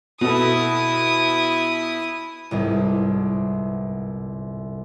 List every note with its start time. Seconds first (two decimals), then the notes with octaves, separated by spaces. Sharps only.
0.21 B2 E4 A4 D#6
2.51 G1 C2 G#2